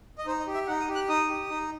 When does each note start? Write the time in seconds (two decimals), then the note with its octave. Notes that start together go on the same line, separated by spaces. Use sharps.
0.18 D#5
0.26 D#4 C5
0.40 D#5
0.47 G4
0.54 E5
0.67 D#4 F#5
0.81 D#6
0.88 G4
0.95 F#6
1.08 D#4 D#6
1.29 G4
1.50 D#4